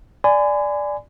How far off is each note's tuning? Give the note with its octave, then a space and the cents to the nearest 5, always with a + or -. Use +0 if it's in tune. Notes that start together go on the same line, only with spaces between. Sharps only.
D5 +0 G#5 +0 B5 +45